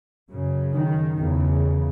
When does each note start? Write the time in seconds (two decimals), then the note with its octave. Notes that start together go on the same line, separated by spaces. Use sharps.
0.33 F#2 C#3
0.76 D#3
1.19 E2 C#3